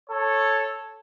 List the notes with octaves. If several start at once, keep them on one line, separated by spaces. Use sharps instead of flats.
A4 C#5